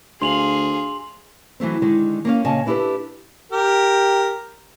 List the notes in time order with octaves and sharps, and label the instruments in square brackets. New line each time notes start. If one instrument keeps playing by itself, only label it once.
[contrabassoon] D2 [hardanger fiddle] G#4 F5 [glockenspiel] C6 F7 F#7
[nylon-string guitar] E3 F#3 A3 C4
D3 D#3 G#3
A#3 C#4 F5
A#2 C#3 C#5 D#5 G#5 A5
B3 D4 E4 G4 A4 B4
[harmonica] G4 A#4